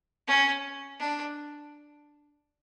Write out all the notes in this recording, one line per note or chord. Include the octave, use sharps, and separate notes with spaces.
C#4
D4